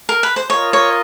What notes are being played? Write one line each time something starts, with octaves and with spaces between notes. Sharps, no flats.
A#4
B4
C5
F4 A#4 C#5 D#5
C#5